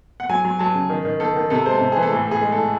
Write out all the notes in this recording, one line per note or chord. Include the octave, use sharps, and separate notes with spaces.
F#5
F#3 G#5
F#3
F#3 A5
C#3
D#3
D#3
D#3 A4
D#3
C3 A4
G#3 C5
A4
C3
E3 G#4
A4
A2 G#4
A2 G#4
G#3
A4
A2